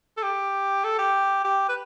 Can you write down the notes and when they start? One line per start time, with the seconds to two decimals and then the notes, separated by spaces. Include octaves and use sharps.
0.17 A4
0.23 G4
0.84 A4
0.99 G4
1.44 G4
1.69 B4